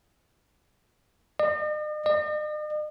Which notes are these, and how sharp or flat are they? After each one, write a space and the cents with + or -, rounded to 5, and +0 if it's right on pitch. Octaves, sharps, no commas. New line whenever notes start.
D#5 -45
D#5 -45